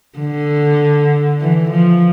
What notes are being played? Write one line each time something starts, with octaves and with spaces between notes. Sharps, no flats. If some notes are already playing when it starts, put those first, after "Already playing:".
D3
E3
F3